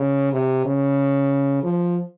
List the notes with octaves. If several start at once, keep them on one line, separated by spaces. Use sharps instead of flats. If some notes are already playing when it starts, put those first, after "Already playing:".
Already playing: C#3
C3
C#3
F3